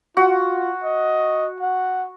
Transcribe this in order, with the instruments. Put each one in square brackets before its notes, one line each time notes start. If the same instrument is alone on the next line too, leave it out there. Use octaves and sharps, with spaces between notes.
[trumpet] F4 [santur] F#4
[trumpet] D#5
F#5